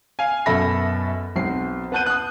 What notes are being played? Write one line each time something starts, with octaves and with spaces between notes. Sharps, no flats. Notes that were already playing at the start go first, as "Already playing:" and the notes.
F5 G#5
F#2 B2 A4 E5 B5 A#6
B1 C4 C7
B3 F#5 A5 F#6 G6 D#7
D#6 F#6